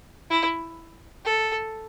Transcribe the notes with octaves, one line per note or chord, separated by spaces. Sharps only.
E4
A4